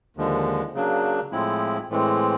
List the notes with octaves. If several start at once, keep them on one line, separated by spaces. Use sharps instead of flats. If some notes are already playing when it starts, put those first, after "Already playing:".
D#2 D3 F3 G#3
C#3 F#3 A#3 D4
A2 F3 G#3 C4 E4
A2 E3 G#3 C4